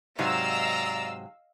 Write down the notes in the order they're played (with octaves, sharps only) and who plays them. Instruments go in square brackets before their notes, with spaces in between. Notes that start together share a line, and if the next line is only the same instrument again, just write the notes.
[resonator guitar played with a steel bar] G#2 C3 F#3 [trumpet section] D5 A#5 [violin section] D#5 F5 E6